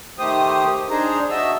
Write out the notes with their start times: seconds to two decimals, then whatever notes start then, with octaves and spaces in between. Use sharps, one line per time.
0.19 D#3 A3 G4 C5 D#6
0.91 D4 D#4 G#4 C5 A#5
1.30 F#4 D#5 E5 A5 E6